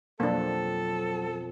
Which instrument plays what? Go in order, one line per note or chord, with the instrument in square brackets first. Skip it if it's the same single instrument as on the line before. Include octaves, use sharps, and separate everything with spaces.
[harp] F2 B2 C4 [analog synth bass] F#3 [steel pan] A#3 D4 [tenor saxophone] A4